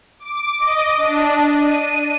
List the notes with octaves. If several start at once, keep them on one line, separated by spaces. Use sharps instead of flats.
D6
D#5
D4
D#7